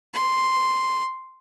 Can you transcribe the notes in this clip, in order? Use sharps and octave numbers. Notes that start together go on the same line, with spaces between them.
C6